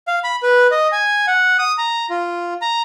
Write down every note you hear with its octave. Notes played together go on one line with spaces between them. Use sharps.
F5
B5
B4
D#5
G#5
F#5
D#6
A#5
F4
A#5